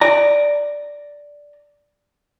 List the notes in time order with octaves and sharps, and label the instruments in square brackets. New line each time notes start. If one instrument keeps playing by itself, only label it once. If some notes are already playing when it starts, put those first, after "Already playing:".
[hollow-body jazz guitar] D5 A#5